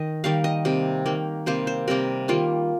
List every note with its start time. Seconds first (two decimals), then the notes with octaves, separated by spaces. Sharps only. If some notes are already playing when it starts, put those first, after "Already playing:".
Already playing: D#3 D#5
0.24 D#3 G3 A#3 F5
0.44 D#5
0.65 C3 G3 A#3
1.06 D#3 A#3
1.46 C3 G3 A#3 C5
1.67 C5
1.88 C3 G3 A#3 A#4
2.28 D#3 G3 A#3 F4